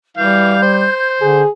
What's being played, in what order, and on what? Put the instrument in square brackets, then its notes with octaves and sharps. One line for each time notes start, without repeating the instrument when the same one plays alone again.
[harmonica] E3 F5 [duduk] G3 [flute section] G6
[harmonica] C5
[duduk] D3 [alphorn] G#4